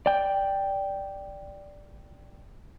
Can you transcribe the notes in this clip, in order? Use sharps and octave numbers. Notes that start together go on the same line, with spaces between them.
D5 G5